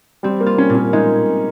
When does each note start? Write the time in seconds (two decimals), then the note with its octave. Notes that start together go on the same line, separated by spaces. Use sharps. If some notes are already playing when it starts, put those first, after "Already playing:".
0.23 G3 C4
0.41 A#3
0.46 F4
0.58 C#4
0.70 A#2
0.75 C#4
0.93 G#3 D#4